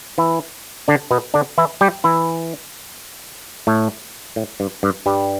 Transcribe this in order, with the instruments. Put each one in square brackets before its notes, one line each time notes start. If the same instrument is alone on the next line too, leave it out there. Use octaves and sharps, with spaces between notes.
[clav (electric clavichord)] E3 E4
D3 D4
B2 B3
D3 D4
E3 E4
G3 G4
E3 E4
A2 A3
A2
G2
G2
G2 G3